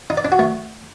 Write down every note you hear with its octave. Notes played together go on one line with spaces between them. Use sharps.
D#4
D5
D4
F#4
A3